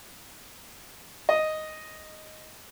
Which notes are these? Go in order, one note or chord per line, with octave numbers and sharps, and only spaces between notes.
D#5